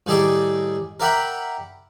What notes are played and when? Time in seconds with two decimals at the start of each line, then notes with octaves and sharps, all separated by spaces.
0.06 A2 D#3 G3 G#4 A4 D6
1.00 A#4 D5 E5 F#5 G5 B5